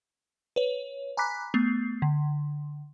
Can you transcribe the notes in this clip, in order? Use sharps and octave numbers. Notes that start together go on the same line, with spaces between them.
B4 C#5
G#5 A#5 B5 D6 F#6 B6
A3 B3 C7
D3